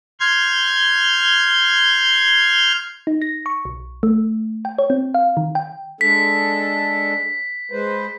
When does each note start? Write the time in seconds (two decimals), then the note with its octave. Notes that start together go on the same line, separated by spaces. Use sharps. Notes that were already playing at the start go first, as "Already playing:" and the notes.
0.20 C6 F6 G6 G#6
3.07 D#4
3.22 A#6
3.46 C#6
3.65 B1
4.03 A3
4.65 G5
4.78 C#5
4.90 C4
5.14 F5
5.37 D#3
5.55 G5
6.01 G#3 D4 A4 B6
7.71 G#3 B4 C5